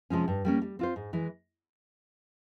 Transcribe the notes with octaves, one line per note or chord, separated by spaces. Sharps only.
C3 F3 G#3 C#4
G2
G3 A#3 C#4
G3
C4 F4 C5
G#2
E3 G#3